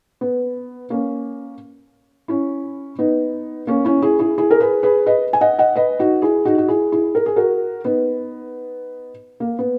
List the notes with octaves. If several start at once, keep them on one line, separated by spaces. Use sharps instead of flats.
B3
A#3 C#4
C#4 E4
B3 D#4
A#3 C#4
C#4 E4
E4 G#4
E4 G#4
E4 G#4
A#4
G#4 B4
G#4 B4
B4 D#5
G#5
D#5 F#5
D#5 F#5
B4 D#5
D#4 F#4
E4 G#4
D#4 F#4
F#4
E4 G#4
E4 G#4
A#4
G#4
F#4 A#4
B3 D#4
A#3
B3